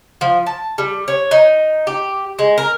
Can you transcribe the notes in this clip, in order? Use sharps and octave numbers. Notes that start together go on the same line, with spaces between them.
F3
A5
G3
C#5
D#4
G4
G#3
A#4